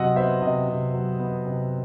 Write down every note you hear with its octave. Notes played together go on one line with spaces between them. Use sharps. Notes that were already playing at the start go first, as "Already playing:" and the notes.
Already playing: C3 F#3 D#5 F#5 C6 E6
B3 C5 E5
C3 D#5
C3
F#3
B3
C3